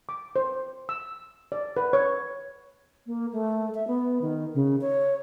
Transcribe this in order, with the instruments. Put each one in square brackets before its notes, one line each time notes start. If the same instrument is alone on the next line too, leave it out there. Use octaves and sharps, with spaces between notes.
[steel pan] D6
C5
E6
D5
B4
C#5
[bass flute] A#3
A3
E5
B3
D#3
C#3
C#5